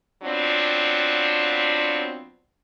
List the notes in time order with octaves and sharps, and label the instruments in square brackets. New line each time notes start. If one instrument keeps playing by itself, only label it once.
[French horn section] F#3 B3 C4 D4 F4